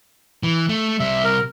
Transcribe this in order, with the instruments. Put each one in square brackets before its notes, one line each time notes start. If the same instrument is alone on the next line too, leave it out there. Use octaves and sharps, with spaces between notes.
[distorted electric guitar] E3
A3
[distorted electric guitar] C3 G3 [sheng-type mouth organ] E5
[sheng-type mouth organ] A#4